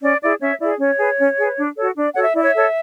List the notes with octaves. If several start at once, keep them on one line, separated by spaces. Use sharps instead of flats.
C#4 D5
E4 G#4 D5
C#4 C#5 E5
E4 G#4 D5
C#4 C#5
G#4 B4
C#4
G#4 B4
D4
F#4 A4 C#5
D4 D5
F#4 A4 C#5 F#5
E5
E4 D5
C#5 E5
A4 C#5